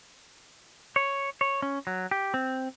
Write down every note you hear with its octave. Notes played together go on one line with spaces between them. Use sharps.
C#5
C#5
C#4
F#3
G4
C4